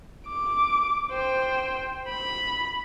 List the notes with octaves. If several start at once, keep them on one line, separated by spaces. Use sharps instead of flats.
D6
C5 G5
B5